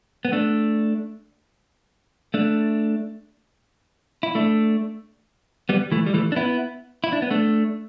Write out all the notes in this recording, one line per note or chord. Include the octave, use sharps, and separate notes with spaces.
B3
A3 D4
A3 D4
E4
A3 D4
G3 B3
E3 A3
G3
E3 A3
D4
B3 E4
E4
D4
B3
A3 D4